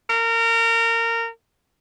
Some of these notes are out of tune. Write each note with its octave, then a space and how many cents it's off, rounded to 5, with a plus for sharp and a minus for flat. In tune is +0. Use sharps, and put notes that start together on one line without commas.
A#4 -25